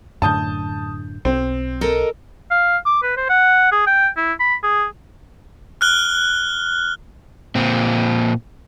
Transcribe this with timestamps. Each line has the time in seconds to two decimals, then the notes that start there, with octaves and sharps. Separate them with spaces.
0.22 F#2 A2 D3 A5 D#6 G6
1.25 B1 C4
1.81 A4 A#4 D#5
2.51 F5
2.85 D6
3.03 B4
3.17 C5
3.29 F#5
3.72 G#4
3.87 G5
4.17 E4
4.40 B5
4.63 G#4
5.81 F6 F#6 G7
7.55 A#2 C4